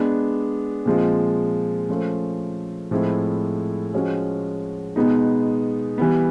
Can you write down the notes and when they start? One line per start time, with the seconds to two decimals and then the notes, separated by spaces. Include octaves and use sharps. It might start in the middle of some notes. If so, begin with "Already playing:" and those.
Already playing: G#3 B3 D4
0.86 A#2 F3 G#3 C4 F4
1.89 F3 A3 C#4 F4
2.91 A2 F3 G#3 C4 E4
3.93 F3 G#3 C#4 F#4
4.96 B2 G#3 B3 D#4
5.98 E3 G3 B3